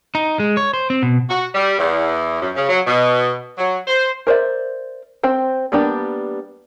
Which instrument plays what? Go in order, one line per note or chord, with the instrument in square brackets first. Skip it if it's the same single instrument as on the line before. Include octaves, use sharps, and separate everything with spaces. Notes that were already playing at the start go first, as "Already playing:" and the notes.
[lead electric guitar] D#4
G#3
C#5
C5
C4
B2
[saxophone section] F#4
G3
E2
F#2
C#3
F#3
B2
F#3
C5
[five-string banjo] A#4 C5 D5 E5
C4 C5 G5
G3 A#3 B3 D4 G4